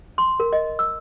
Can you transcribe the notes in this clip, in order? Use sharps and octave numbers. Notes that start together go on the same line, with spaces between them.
C6
A#4
D#5
E6